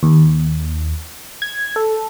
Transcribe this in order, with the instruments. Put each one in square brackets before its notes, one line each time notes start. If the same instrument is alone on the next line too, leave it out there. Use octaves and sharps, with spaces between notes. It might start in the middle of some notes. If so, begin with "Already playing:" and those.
[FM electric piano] D#2
G#6
A4